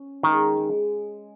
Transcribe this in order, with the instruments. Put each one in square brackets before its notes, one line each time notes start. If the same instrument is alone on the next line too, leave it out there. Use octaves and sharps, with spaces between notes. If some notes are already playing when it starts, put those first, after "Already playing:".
Already playing: [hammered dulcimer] C#4
[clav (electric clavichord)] D#3 [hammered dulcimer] G#3
[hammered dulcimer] G#3